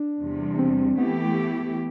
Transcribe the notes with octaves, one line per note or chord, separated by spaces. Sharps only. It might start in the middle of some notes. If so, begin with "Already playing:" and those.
Already playing: D4
E2 C3 G3
C4
E3 A3 B3 E4 G4